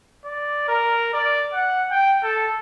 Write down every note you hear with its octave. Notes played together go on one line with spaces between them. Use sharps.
D5
A#4
D5
F#5
G5
A4